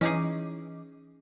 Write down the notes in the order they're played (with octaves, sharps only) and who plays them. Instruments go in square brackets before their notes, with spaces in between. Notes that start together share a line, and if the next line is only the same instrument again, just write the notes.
[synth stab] E3 D#5 D6 [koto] C#4 D#4 G#4